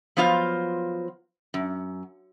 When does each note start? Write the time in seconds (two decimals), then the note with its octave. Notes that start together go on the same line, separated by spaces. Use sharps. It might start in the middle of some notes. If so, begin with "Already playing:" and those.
0.17 F3 F#3 B3 F4 C5 F5
1.54 F#2